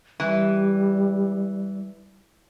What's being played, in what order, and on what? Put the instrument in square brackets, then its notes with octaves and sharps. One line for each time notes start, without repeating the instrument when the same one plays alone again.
[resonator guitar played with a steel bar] E3 [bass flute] G3